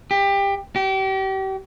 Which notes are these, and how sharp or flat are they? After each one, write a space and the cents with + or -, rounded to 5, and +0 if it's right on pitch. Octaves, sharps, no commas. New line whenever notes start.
G4 +20
G4 -35